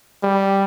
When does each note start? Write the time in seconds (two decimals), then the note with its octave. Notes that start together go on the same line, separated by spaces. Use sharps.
0.23 G3